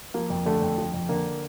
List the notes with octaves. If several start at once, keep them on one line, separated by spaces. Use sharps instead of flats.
F3 A#3
F2
D3 A3
F2
F3
F2
D3 A#3